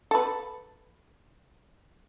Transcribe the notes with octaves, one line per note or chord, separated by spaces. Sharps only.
A4 B4